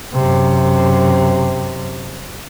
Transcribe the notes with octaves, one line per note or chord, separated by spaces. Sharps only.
F#2 C3